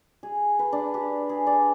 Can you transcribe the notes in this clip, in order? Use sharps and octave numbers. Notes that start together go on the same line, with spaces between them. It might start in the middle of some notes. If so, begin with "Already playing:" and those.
G#4
B4
D4
G4
G#4
D5